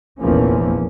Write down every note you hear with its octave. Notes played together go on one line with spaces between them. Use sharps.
F1 A#1 E2 F3 A#3 C#4